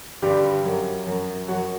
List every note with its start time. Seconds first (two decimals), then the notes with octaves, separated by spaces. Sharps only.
0.22 G2 D3 G3 G4
0.64 F#2 F#3
1.06 F#2 F#3
1.48 F#2 F#3 F#4